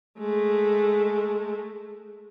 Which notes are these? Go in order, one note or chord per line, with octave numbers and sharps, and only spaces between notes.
G#3 A3